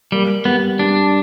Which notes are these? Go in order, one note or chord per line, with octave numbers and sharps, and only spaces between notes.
G3 A#3
G3 B3
G3 D4